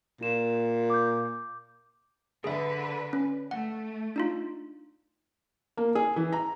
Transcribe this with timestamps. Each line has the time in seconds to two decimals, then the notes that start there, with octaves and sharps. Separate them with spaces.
0.21 A#2 F4 E7
0.90 D6 G6
2.44 D3 G#4 B4 E5
3.13 C#4
3.51 A3 F#5
4.16 D4 D#4 F4
5.77 A#3
5.95 G#4
6.16 E3
6.32 A#5